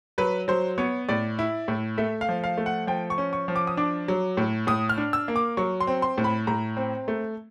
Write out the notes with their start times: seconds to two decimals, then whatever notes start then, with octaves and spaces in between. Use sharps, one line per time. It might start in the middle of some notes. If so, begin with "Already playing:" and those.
0.18 F#3 B4
0.48 F#3 C5
0.78 B3 C#5
1.09 A2 D5
1.39 E4
1.68 A2
1.98 A3 E5
2.21 F5
2.29 F3
2.44 F5
2.58 A3
2.66 F#5
2.87 F3 G5
3.10 C#6
3.18 C#4
3.33 C#6
3.48 F3
3.56 D6
3.67 D#6
3.77 D4 D6
4.08 F#3
4.37 A2
4.67 A2 D#6
4.89 F6
4.98 D4
5.13 E6
5.28 A#3
5.36 D6
5.57 F#3 C#6
5.80 C6
5.87 C4
6.02 C6
6.18 A2
6.24 B5
6.47 A2 A#5
6.77 C4
7.08 A3